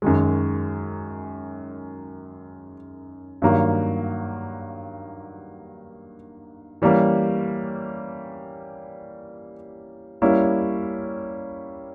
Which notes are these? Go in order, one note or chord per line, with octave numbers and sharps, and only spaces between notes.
F#2 D#3 G#3
G2 D#3 F#3 A#3
E3 G3 A#3 C#4
G3 A#3 C#4 E4